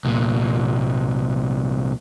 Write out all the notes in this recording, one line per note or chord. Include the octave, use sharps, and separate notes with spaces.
C2 A#2